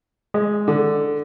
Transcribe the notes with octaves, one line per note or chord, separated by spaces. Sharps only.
G#3
D3